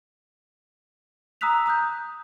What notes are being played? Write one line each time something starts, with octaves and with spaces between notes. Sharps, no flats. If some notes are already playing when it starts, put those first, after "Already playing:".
A#5 D#6 E6 F#6 B6 F7
A#5 D#6 F#6 G6